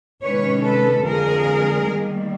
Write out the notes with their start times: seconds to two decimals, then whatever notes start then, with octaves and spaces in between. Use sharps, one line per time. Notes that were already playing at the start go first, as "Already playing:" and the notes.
0.23 C3 D#3 G#3 C#4 B4 C#5
0.63 A4 B4
1.03 F2 D3 F3 G#3 G#4 A#4
1.84 D#3 G3 A#3